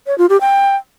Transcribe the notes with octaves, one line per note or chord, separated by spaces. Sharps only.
C#5
F4
G4
G5